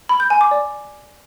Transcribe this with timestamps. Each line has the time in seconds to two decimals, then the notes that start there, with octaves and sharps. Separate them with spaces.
0.09 B5
0.20 G6
0.30 G#5
0.41 D6
0.51 D5